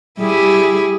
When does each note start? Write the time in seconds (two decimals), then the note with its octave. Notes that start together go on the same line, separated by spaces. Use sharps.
0.19 G3 E4 G4 G#4